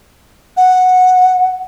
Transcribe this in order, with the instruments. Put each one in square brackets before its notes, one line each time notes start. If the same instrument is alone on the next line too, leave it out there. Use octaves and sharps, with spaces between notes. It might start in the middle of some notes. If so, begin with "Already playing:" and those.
[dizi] F#5